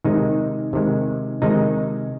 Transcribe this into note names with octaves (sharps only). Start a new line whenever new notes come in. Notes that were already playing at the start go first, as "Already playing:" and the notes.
C3 D#3 G#3 D#4
C3 D#3 G#3
C3 D#3 G#3 D#4